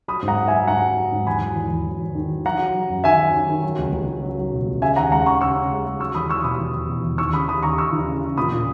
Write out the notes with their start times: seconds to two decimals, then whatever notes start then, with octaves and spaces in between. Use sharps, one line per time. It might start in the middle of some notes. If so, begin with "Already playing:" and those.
0.08 F#3 B5 D#6
0.23 G#2
0.28 F#5 A#5
0.37 F#3
0.48 E5 G#5
0.52 F#3
0.68 G#2 F#5 A#5
0.82 F#3
0.97 F#3
1.12 G#2
1.27 E2 G#5 B5
1.41 F#3
1.56 E2
1.71 E2
1.87 F#3
2.01 E2
2.15 D#3
2.30 F#3
2.45 F#3 F#5 A#5
2.59 F#3
2.75 F#3
2.89 F#2
3.04 D#3 E5 G#5
3.19 F#3
3.35 D#3
3.49 D#3
3.64 F#3
3.78 C#2
3.93 C#2
4.09 C#2
4.23 F#3
4.38 F#3
4.53 B2
4.67 C#2
4.81 C#3 E5 G#5
4.96 D#2 F#5 A#5
5.11 G#3 F#5 A#5
5.26 C#3 A#5 C#6
5.41 C#3 C#6 E6
5.56 C#3
5.70 G#3
5.86 G#3
6.00 F#3 C#6 E6
6.15 E2 B5 D#6
6.29 E2 C#6 E6
6.44 B2 B5 D#6
6.59 E2
6.74 E2
6.89 B2
7.04 E2
7.18 D#2 C#6 E6
7.33 C#3 B5 D#6
7.48 D#2 B5 D#6
7.63 D#2 A#5 C#6
7.78 D#2 C#6 E6
7.92 E3
8.08 C#3
8.23 C#3
8.37 A#2 B5 D#6
8.52 A#2